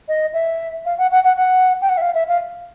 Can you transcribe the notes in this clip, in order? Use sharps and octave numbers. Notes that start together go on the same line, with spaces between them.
D#5
E5
F5
F#5
F#5
F#5
F#5
G5
F#5
E5
F5
E5
F5